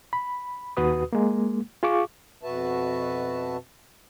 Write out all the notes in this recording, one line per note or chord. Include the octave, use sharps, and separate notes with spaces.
B5
D#2 F#4 B4 D#6
G#3 A#3
F4 G#4 F5 C#6 D6
F2 B2 F#4 B4 E5 A5